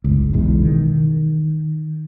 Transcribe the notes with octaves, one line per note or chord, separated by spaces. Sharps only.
F#1 C#2
E1 B1 E3 G#3
D#3